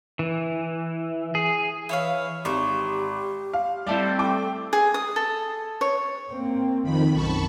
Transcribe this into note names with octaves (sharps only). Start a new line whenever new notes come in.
E3
G#4
E3 E4 C#5 F5
G#1 G4 C5 C#6
F5
G3 A3 C4 E4 A4 D5
A4 G5 D6
G#4
D#6
A4
C#5
A#3 C4
F2 D#3 B5
B1 F#2 A5 B5 C#6